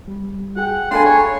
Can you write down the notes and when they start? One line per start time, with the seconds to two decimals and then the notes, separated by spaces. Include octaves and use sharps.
0.08 G3
0.56 F#4 G#4 F#5 G5
0.91 D4 A4 F5 G5 G#5 B5 C6
1.05 C#5